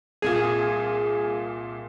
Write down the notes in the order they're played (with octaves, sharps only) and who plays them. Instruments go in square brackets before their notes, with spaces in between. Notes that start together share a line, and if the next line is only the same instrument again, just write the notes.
[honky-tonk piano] C2 A#2 F4 [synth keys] G#4